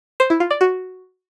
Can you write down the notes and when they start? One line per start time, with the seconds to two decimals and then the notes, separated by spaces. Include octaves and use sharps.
0.20 C5
0.30 E4
0.40 F4
0.51 D5
0.61 F#4